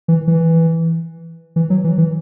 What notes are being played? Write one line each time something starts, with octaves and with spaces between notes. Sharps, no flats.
E3
E3
E3
F#3
E3
E3